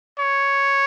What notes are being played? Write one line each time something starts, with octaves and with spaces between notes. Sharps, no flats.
C#5